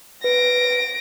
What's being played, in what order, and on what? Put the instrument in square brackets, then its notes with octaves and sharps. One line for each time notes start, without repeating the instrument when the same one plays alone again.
[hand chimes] B4 [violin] A#6 D7